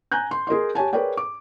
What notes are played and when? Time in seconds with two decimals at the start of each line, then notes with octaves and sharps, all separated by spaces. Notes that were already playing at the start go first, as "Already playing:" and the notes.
0.12 G#5 A#5 F#6 G6
0.31 C6
0.47 G#4 A#4 D#5 C6
0.75 G4 C#5 G#5 A5
0.93 G#4 A#4 B4 C#5 D5 G5
1.17 D6